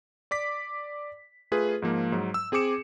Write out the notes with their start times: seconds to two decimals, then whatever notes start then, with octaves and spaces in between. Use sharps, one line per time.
0.31 D5 D6 B6
1.51 A3 F4 G#4 B4
1.82 G#2 F3 A#3
2.12 G#2 F#3
2.34 E6
2.52 C4 G#4 G#5 D6 C#7 E7